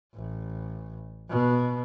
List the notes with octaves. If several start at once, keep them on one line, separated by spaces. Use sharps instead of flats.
A1
B2